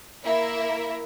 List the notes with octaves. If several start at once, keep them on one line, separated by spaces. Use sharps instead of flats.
A#3 E4 A#4 E5